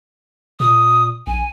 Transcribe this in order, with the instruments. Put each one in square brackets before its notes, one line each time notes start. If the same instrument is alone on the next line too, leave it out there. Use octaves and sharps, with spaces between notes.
[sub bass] A#2 [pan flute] D#6
[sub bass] A#1 [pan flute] G#5